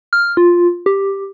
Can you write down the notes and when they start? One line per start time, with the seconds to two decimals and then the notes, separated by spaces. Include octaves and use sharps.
0.13 F6
0.37 F4
0.86 G4